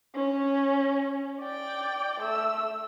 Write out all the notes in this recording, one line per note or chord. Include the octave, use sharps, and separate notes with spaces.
C#4
D5 G5
A3 E6